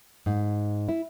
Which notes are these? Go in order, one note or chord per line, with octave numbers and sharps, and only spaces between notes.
G#2
E4